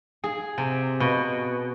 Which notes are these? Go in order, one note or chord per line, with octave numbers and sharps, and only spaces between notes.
G#4
C3
B2